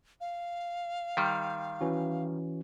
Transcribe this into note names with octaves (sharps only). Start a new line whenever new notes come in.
F5
D#3 G3 C6
E3 C#4 F#4